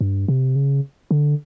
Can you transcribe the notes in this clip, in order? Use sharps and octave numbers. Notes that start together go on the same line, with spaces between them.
G2
C3
C#3
D3